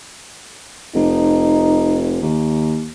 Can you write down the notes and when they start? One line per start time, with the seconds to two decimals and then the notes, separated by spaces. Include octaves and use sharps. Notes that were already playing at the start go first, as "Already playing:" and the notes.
0.95 F1 D#4
2.22 D#2